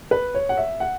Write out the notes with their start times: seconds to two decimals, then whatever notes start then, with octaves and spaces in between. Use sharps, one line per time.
0.11 B4
0.34 C#5
0.49 F#5
0.57 E5
0.80 F#5